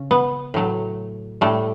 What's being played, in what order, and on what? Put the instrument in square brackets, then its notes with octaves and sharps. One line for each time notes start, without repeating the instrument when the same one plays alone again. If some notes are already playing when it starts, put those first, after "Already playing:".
Already playing: [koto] C#3 C#4
B3
A2 F#3 A3
A2 G3 A3